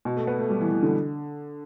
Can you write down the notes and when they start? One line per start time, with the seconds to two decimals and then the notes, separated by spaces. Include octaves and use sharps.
0.05 B2
0.17 A3
0.27 B3
0.39 A3
0.50 G3
0.61 E3
0.71 E3
0.83 D3